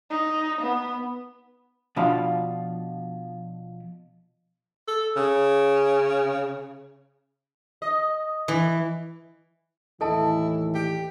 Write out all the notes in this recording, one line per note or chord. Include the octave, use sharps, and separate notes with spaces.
D#4
B3
B2 F3 D4 F4 F5 B5
A4
C#3
D#5
E3
D#2 A2 E3 E4 A4 D#5 A5
G4